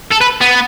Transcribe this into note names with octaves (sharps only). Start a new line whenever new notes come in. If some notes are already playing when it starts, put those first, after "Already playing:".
A4
B4
B3